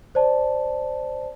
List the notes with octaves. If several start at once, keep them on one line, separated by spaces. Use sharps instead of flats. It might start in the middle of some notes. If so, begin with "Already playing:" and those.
C5 D5 A5